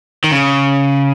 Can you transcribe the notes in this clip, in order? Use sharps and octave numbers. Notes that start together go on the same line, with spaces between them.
D#3
C#3